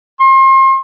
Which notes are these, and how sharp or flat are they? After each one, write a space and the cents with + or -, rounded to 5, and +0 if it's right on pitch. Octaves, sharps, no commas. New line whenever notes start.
C6 +35